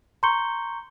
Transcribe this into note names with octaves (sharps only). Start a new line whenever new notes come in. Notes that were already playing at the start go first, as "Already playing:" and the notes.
A#5 C6 C#6 G6 C#7 G7